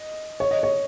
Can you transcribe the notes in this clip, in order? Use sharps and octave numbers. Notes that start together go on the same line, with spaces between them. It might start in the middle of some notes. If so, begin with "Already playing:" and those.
Already playing: D#5
C#5
D#5
C#5